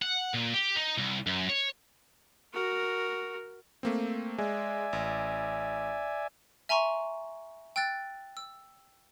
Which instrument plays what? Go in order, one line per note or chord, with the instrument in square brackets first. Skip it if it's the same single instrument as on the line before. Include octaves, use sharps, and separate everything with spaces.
[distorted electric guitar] F#5
A#2
G4
D#4
C2
F#2
C#5
[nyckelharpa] F#4 A#4
[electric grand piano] A3 A#3 C4
[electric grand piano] G#3 [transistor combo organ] D5 E5 G#5
[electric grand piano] A1
[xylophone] E5 G#5 A#5 C6 C#6
G5 E6 F#6 A6
E6